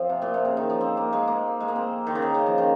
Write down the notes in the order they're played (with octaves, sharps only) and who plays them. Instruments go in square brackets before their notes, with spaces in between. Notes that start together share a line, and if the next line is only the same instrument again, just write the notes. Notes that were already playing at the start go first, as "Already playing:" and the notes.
Already playing: [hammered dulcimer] F3 C4
C3
A#2
C3
C#3
D#3
F3
C4
A#3
G#3
A#3
G#3
A#3
C4
D#3
C#3
D#3
C#3
F3
D#3